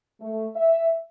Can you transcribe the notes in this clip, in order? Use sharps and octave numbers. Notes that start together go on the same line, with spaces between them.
A3
E5